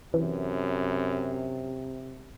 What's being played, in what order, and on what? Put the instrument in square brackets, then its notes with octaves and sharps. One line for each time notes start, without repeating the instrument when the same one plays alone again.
[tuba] F#2 [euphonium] C3 [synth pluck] E3